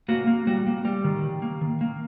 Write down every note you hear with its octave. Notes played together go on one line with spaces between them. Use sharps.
A#3 F#4
A#3
G3 F#4
A#3
G3 G4
D#3
D#3
A#3
D#3
A#3